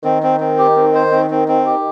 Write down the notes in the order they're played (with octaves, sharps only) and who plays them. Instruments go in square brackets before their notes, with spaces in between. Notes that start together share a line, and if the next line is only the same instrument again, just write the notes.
[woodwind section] D#3 [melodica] C4
[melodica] C4
C4
G4
C4
C5
C4
C4
C4
G4